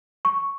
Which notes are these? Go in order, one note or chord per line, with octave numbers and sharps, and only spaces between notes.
C#6